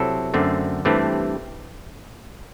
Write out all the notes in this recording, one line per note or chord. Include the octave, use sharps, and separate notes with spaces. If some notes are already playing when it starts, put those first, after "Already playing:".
Already playing: C3 F#3 C4 E4 A4
F#2 D3 A3 C4
G2 E3 A3 C4 G4